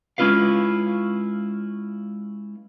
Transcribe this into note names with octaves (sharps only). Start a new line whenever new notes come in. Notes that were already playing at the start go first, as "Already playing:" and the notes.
G#3 C#4 E4 F4 B4 F5